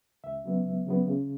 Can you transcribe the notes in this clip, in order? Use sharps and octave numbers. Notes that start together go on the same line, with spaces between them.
C#2 E5
C#3 F#3 B3
C#2
C#3 F#3 B3
C#3